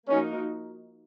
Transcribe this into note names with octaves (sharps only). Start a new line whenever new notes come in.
F3 A#3 C#4 D#4 F#4 A#4